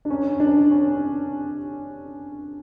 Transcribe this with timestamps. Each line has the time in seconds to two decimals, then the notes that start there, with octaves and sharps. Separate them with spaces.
0.05 D4
0.10 C#4
0.35 C#4
0.40 D4
0.71 C#4